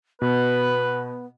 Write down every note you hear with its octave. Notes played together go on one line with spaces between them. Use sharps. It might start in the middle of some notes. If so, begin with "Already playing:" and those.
B2 B3 B4